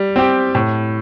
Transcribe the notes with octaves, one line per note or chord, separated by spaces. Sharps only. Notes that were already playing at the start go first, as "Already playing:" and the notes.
Already playing: G3
C4 G4
A2